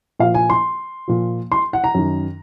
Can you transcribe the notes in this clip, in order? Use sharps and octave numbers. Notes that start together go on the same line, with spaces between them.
A#2 F3 F5
G#5
C6
A#2 F3
C6
F#5
A#5
F#2 D#3